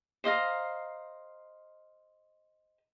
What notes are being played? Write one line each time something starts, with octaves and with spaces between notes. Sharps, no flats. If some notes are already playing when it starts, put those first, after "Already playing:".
C5 D#5 F5 A#5